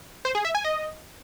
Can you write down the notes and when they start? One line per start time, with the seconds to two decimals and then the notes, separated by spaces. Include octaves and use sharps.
0.25 C5
0.35 G#4
0.45 E5
0.55 G#5
0.64 D#5